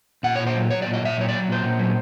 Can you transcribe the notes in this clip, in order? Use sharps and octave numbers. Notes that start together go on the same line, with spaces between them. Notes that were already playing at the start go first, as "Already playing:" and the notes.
A#2 F#5
A#2 C#5
C5
F#3
F#3 C#5
A#2 D5
D#5
A#2 E5
F#3 C#5
F#3 D5
A#2 C5
A#2
F#3